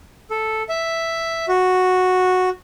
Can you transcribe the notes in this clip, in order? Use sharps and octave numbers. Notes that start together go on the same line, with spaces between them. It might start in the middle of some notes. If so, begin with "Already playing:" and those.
A4
E5
F#4